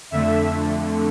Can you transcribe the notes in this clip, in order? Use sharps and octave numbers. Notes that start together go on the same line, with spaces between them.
F2 D3 A3 E5